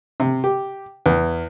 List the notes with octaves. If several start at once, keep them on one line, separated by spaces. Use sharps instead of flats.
C3
G4
E2